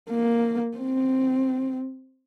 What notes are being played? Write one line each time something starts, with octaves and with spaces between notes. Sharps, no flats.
A#3
C4